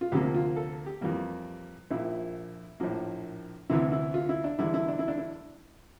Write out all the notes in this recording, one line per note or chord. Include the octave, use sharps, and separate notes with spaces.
F4
D2 C3 F3 A#3 G4
F4
A4
G4
F2 E3 G3 A#3
A#1 A#2 F3 E4
A#1 A2 F3 A#3
D2 C3 E3 E4
E4
F4
E4
D4
E2 D3 G3 E4
E4
D4
E4
D4
E4